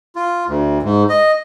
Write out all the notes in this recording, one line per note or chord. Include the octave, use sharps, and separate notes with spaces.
F4
D2
G#2
D#5